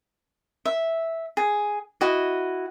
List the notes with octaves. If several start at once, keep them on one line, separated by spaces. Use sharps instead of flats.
E5
G#4
E4 F#4 D#5